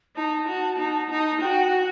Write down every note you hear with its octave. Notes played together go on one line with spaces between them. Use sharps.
D#4 A5
F#4
D#4
D#4
F#4 G5
F#5